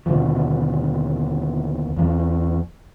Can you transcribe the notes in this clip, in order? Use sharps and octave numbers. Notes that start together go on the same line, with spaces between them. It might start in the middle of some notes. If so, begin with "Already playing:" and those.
D#2 B2 D3 F3
E2 F3